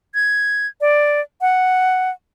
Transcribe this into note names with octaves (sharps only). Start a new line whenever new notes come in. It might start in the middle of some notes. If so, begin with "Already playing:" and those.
G#6
D5
F#5